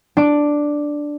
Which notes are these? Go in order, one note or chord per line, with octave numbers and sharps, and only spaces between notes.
D4 D6